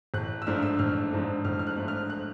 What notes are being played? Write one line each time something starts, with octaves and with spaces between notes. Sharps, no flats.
A1 F#6
E6
G#2 F3 A3 D4 F6
E6
A1 F6
G#2 F3 A3 D4
A1 F6
F6
F#6
G#2 F3 A3 D4
F6
F#6